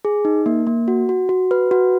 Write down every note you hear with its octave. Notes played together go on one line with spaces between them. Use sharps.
G#4
D#4
A#3
A#3
F#4
F#4
F#4
B4
F#4